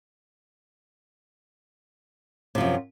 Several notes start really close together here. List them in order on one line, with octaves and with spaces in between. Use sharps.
C3 F3 F#2